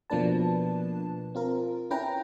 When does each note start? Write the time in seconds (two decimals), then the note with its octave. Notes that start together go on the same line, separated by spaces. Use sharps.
0.10 B2 F3 A#3 D4 B4 A5
1.35 C4 F4 A#4
1.91 C#4 E4 B4 G5 A#5